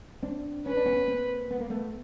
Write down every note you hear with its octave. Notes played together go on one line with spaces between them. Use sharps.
C4 D4
C#4 B4
D4
B3 C#4
A#3 C4
B3
A#3
A3 B3